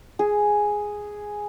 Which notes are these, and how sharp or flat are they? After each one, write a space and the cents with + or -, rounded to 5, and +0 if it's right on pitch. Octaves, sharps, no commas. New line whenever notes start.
G#4 +0